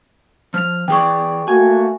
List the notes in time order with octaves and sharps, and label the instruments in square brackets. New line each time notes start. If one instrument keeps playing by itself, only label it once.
[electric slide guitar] F3 [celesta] F6 F7
[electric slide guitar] E3 G#4 D5 [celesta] G5 C#6
[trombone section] A3 A#3 F#4 [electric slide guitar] G#5